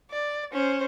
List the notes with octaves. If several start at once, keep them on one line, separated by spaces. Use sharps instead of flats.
D5
C#4 C5